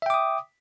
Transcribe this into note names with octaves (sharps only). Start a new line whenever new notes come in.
E5 G5 D6 D#6